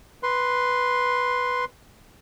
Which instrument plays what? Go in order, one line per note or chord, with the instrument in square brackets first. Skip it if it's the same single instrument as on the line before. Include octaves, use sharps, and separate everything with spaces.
[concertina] B4 C6